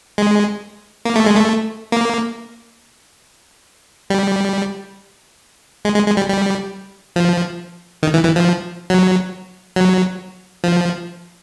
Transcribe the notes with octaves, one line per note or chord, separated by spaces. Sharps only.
G#3
A#3
A3
G#3
A3
A#3
G3
G#3
G#3
G#3
G3
G3
F3
D#3
E3
E3
F3
F#3
F#3
F3